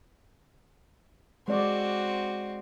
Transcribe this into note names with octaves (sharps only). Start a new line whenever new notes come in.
G#3 C4 F#4 D5